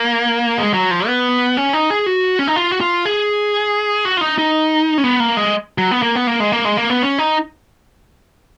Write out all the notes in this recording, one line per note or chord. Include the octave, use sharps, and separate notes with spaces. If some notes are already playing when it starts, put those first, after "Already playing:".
Already playing: A#3
G#3
F#3
F3
B3
C#4
D#4
G#4
F#4
C#4
D#4
F4
F#4
F4
G#4
F#4
F4
D#4
D#4
C#4
B3
A#3
G#3
F#3
B3
A#3
B3
A#3
G#3
A#3
G#3
A#3
B3
C#4
D#4